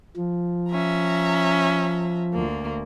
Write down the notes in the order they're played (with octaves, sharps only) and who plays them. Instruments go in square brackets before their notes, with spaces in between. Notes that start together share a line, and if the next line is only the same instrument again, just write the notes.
[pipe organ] F3
[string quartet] C#4 E5 A#5
D2 A#3